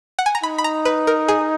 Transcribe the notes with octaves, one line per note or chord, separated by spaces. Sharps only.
F#5
G#5
A#5
D#4 B5
B5
A#5
B4
A#4
G#4